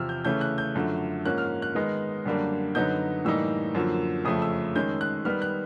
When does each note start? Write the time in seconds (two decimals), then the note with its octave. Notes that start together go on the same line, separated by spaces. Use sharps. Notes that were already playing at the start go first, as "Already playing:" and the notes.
Already playing: E2 C3 F3 E6 F6
0.09 G6
0.25 C#3 E3 A3 C#4 G6
0.41 F#6
0.58 G6
0.75 F#2 D3 F3 A3
1.25 G#2 F3 A#3 C#4 F#6
1.38 F6
1.62 F#6
1.75 D#3 G#3 B3 D#4
2.26 F#2 D3 G3 A#3 D4
2.75 F#2 D3 F#3 B3 D#4 G6
3.25 A2 E3 G3 A#3 D#4 E6
3.75 F#2 D3 F3 A#3
4.25 F2 C#3 F3 A3 D#6
4.42 E6
4.76 D#3 G#3 C#4 G6
5.01 F#6
5.25 D#3 G3 B3 F6
5.42 F#6